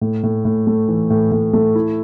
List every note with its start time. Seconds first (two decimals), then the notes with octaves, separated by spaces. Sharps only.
0.01 A2
0.24 A2
0.45 A2
0.67 A3
0.88 E3
1.10 A2
1.32 A2
1.53 A3
1.75 E4